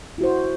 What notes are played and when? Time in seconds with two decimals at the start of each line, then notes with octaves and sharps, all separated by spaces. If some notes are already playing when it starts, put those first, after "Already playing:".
0.18 E4
0.21 F#4
0.23 C5